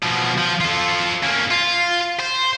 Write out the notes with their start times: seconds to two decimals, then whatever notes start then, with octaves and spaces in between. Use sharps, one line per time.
0.02 B2 F3
0.38 F3
0.61 F4 A4
1.23 A#3 C#4
1.51 F4
2.20 C5